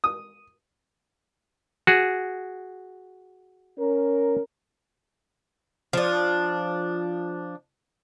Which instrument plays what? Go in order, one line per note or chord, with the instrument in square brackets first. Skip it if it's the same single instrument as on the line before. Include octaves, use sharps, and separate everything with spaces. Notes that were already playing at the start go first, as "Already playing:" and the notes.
[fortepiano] D#6
[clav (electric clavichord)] F#4 G#4
[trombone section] C#4 A#4
[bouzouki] F3 D4